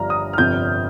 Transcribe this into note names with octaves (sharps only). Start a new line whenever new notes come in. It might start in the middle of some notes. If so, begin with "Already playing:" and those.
Already playing: G1 G2 F3 A#5 F6
D#6
F6
G1 F2 C3 F3 G6